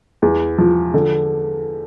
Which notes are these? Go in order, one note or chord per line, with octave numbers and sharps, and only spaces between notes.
E2
F3
D3